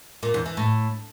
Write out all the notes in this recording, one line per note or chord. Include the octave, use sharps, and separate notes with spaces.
A#2
E2
E3
A2